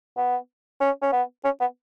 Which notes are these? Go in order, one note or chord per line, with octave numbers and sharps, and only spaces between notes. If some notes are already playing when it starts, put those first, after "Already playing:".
B3
C#4
C#4
B3
C#4
B3